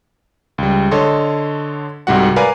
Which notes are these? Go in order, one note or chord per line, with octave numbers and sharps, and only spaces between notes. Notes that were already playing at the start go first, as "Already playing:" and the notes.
C#2 G3
D3 A4 C#5 D#5 C6
C2 G#2 G3 F#4 F#5
A#4 B4 D5 F5 G#5